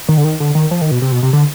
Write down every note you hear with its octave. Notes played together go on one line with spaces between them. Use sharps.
D#3
D3
D#3
D3
D#3
F3
D#3
B2
C3
B2
C3
D3